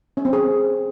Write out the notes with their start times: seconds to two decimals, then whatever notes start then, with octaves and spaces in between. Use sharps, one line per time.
0.17 C#4
0.25 C4
0.33 G#4